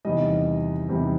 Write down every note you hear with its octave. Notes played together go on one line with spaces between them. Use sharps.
E2 C3 D#3 G3 D#5
E2 C3 D#3 G3